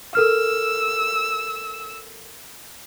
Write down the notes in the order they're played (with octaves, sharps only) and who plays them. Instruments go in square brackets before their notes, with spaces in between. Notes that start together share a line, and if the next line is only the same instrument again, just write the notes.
[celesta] A4 A#4 F6 [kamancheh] E6